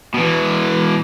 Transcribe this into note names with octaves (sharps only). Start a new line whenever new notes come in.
B2 E3